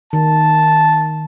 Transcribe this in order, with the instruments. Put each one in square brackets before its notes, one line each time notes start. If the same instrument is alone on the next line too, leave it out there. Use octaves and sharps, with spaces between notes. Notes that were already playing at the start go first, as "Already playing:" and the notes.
[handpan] D#3 [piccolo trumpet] A5